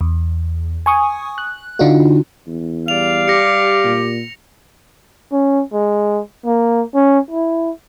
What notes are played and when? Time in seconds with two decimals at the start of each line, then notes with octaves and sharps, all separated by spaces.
0.01 E2
0.86 G#5 C#6 D#6
1.38 F#6
1.79 D3 D4 D#4 F4 F#4
2.47 E2
2.88 G3 D5 F5 F7
3.28 G4 A#6 C#7
3.84 A#2
5.32 C#4
5.73 G#3
6.46 A#3
6.94 C#4
7.31 E4